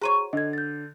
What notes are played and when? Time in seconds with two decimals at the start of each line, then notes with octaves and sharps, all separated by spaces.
0.01 F#4 G#4 C5 C#5 A#5 D#7
0.33 D3 D#5 G#6
0.53 G6 A6